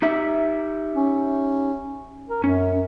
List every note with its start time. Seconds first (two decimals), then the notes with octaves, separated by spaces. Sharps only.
0.02 D#4 G4 E5
0.95 C#4
2.29 A#4
2.44 F#2 C#4